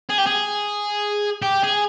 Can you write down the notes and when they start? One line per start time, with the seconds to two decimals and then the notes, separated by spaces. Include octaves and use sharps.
0.10 G#4
0.18 G4
0.26 G#4
1.42 G4
1.63 G#4